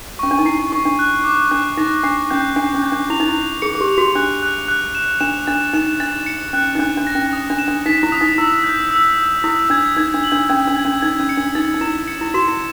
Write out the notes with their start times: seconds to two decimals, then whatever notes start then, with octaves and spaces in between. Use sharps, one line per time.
0.19 C#4 C#6
0.31 D4
0.39 D#4
0.45 E4 C7
0.59 D#4
0.72 D#4 C#6
0.85 D4
0.99 F#6
1.24 D6
1.51 D4 F#6
1.77 D#4 A#6
2.04 D4 C7
2.30 C#4 G6
2.56 D4 C7
2.75 C#4
2.83 G6
2.92 D4
3.10 E4 F7
3.20 D#4
3.29 E4
3.36 F7
3.62 G#4 C#7
3.75 G#4
3.81 G4
3.88 F7
3.98 F#4
4.15 D4 F#6
4.42 F#6
4.68 F#6
4.95 E7
5.21 D4 E7
5.47 D4 A6
5.73 D#4 E7
6.00 D4 A6
6.26 C#7
6.53 C#4 F#6
6.75 D#4
6.79 D4 F#6
6.97 D4
7.07 A#6
7.15 C#4
7.33 D#6
7.50 D4
7.59 E7
7.68 D4
7.86 D#4 B6
8.03 E4
8.12 D#6
8.21 D#4
8.38 E4 E6
8.64 G6
8.90 E6
9.17 E6
9.44 E4 D#6
9.70 D4 G#6
9.97 D#4 G#6
10.14 D4
10.24 F#7
10.32 D4
10.49 C#4 G#6
10.68 D4
10.76 G#6
10.85 C#4
11.02 D#4 G#6
11.20 C#4
11.29 C#7
11.38 D4
11.55 D#4 A6
11.74 D#4
11.81 E4 E7
12.08 C#7
12.21 E4
12.34 F#4 E7
12.48 E4